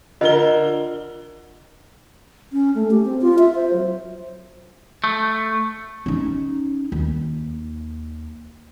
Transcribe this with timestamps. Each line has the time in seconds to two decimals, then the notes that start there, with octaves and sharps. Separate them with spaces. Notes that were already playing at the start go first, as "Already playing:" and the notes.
0.21 D3 F4 A#4 D#5 G7
2.53 C#4
2.75 A3
2.91 G4
3.05 C4
3.21 F4
3.38 E5
3.55 C5
3.73 F#3
5.04 A3
6.06 C#4 D#4
6.92 D#2